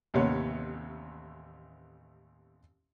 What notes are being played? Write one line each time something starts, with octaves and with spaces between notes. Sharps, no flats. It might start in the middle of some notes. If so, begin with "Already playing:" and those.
A1 D#2 C3 B3 C#5